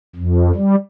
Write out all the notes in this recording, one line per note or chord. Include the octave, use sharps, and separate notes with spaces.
F2
G3